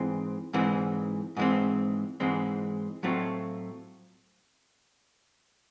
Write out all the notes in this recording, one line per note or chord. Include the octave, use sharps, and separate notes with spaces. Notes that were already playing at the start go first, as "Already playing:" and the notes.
Already playing: G#2 E3 G#3 C4
G#2 E3 G#3 C4
G#2 E3 G#3 C4
G#2 E3 G#3 C4
A2 F#3 A3 C4 F4